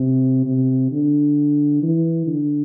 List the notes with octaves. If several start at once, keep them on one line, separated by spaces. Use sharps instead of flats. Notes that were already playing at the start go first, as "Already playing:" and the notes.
Already playing: C3
C3
D3
E3
D3